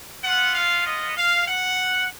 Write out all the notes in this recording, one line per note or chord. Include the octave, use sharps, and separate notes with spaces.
B3 F4 F#5
F5
D#5
F5
F#5